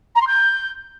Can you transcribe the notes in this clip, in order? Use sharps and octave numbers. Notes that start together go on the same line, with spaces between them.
A#5
C6
G6